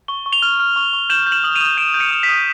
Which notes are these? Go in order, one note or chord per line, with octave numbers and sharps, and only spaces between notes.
C#6 G7
C#6
F7 G7
F6
F6
C#6
C#6
G6 E7 F#7
G6
E7 F#7
D#6 F#7
D#7 F7
D#6
G6 D7 E7
G6
C#7 D#7
D#6
B6
D#6